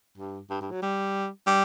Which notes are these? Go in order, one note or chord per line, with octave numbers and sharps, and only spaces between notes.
G2
G2
G2
F#3
G3
G3